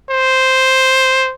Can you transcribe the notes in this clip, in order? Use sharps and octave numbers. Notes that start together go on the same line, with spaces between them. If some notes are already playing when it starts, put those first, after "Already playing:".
C5